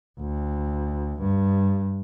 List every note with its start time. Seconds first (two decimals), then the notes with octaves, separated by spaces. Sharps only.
0.20 D2
1.20 G2